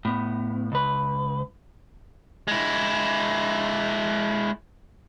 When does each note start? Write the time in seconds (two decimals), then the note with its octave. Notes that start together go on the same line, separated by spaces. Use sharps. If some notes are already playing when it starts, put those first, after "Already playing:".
0.05 A2 B3
0.72 C#2 B4
2.48 G#3 E4